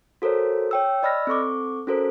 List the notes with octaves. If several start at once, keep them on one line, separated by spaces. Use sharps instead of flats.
F#4 A4 A#4 C5 C#5
C#5 G5 E6
D5 D#5 B5 E6 F6 A#6
C4 A4 C#6 D6
C#4 F#4 A4 A#4 C5